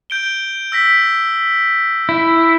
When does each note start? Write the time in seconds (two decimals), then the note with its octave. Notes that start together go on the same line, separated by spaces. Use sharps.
0.10 G6 D7 G7
0.72 E6 A#6 B6
2.09 E4